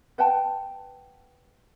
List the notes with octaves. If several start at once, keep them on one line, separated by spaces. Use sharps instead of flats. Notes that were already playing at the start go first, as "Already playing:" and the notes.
B4 F#5 G5 A5